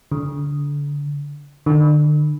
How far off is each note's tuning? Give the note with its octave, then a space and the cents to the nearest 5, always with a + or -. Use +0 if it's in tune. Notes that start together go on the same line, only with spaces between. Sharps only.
D3 -25
D3 +35